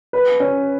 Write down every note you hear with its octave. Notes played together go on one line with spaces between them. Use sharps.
B4
C#4